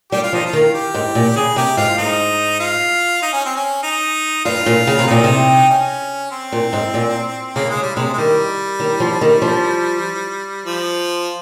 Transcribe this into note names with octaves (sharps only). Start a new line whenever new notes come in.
G3 G4
F4
F3 D#4
F4
D#3
G4
G#2
A#2
C#3 G#4
C3 G4
G#2 F4
G#2 D#4
F4
D#4
C#4
C4
C#4
D#4
G2 F4
A#2
C#3
C3
A#2 D#4
C3
C#4
C4
A#2
G#2
A#2
C#3 A#3
G#3
C#3
G3
C3 G#3
G#3
D#3 G3
D#3
F3
D#3
F3
F3